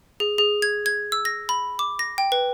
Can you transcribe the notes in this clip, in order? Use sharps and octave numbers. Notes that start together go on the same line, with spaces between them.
G#4
G#4
G#6
G#6
E6
A#6
B5
D6
A#6
G5
B4